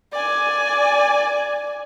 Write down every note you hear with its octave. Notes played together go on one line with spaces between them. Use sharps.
D5 G#5